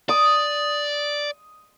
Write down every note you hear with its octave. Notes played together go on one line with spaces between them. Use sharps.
D5 D#6